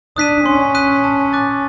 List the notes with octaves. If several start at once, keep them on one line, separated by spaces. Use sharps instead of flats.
D4 D#6 F#6 B6 D#7
C#4 C6
D#6 F#6 B6 D#7
A5
D6 F#6 A6